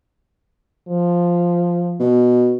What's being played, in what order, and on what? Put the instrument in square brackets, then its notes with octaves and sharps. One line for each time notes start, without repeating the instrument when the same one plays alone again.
[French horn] F3
[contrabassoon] B2